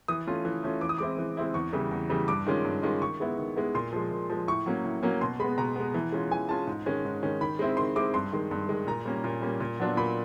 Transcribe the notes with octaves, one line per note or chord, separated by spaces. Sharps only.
E3 D#6
A3 C#4 F4
E3
A3 C#4 F4
E3 D6
D#6
G#3 C4 E4 D6
E3
G#3 C4 E4
E2 C#6
C#3 E3 G3
E2
C#3 E3 G3
G2 D6
D#3 G#3 C#4 F4
G2
D#3 G#3 C#4 F4
D#3 C#6
G#3 B3 E4
D#3
G#3 B3 E4
A#2 C6
F3 G#3
A#2
F3 G#3
A2 C#6
F#3 A#3 C#4
A2
F#3 A#3 C#4
B2 C6
G#3 B3 B5
B2 A#5
G#3 B3
E3
G#3 C#4 F4
E3 G#5
G#3 C#4 F4 A5
G#2
D#3 G#3 C#4
G#2
D#3 G#3 C#4
D#3 B5
G#3 C4 E4
D#3 C6
G#3 C4 E4 D6
G2 C6
D#3 G#3
G2
D#3 G#3
A#2 A#5
G3 A#3 C#4
A#2
G3 A#3 C#4
A#2
F#3 B3 D4 F4
A#2 B5